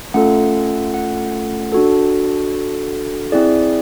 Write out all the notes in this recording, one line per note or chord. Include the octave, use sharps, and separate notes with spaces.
A3 C#4 F4 A4 F#5
F#5
D4 F#4 A4
C4 E4 G#4 D5